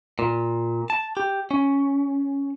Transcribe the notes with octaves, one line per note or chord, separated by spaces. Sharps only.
A#2
A5
G4
C#4